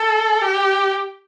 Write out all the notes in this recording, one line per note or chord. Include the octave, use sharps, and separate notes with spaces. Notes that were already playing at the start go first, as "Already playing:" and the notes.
Already playing: A4
G4